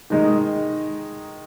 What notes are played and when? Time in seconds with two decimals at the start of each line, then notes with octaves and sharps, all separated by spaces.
0.10 D#3 G#3 D#4